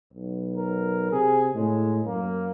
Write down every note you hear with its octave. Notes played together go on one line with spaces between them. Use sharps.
B1
A#4
C3 G#4
A2 G#3
F#2 A#3